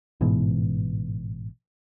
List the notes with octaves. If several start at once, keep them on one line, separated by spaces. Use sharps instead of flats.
A1 G#2 B2 E3